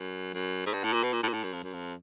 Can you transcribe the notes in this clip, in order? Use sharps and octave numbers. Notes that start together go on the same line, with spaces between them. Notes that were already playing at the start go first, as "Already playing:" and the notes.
Already playing: F#2
F#2
G#2
G2
A2
A#2
B2
A#2
A2
A#2
A2
F#2
F2
F#2
F2